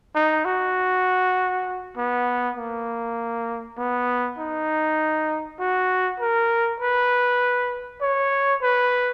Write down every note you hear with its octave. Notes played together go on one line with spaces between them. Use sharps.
D#4
F#4
B3
A#3
B3
D#4
F#4
A#4
B4
C#5
B4